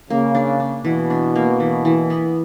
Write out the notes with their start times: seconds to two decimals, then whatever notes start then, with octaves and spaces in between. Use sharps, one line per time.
0.10 C#3 A#3
0.35 D4
0.60 D4
0.85 B2 E3
1.10 D4
1.36 A#3
1.60 E3
1.85 E3
2.10 B3